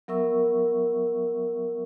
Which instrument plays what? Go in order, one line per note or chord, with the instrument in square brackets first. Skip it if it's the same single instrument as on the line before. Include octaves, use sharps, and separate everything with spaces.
[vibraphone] F#3 B3 A#4 E5 C#6 E6